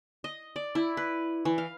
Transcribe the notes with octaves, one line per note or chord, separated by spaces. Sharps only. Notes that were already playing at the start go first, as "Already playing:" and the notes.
D#5
D5
E4
B4
E3
F5